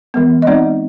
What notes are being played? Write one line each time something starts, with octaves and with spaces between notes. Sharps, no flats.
E3 G#3 B3
D#5
G#3 C4 D#4 D5